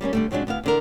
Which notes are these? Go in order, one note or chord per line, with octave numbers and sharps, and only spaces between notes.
G3 A#3 C4 C#4
D3 G3 A3
F2 C#3 F#3 G#3 D4
D2 B3 E4 F5
E2 D3 A#4